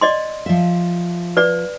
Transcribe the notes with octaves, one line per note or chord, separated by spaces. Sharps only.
D5 D#5 C6
F3 E5
B4 D5